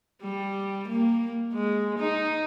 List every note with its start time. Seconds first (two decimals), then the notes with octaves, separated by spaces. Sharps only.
0.23 G3
0.88 A#3
1.54 G#3
1.99 D#4